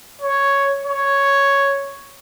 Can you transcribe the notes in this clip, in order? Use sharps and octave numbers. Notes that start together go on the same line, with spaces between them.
C#5
C#5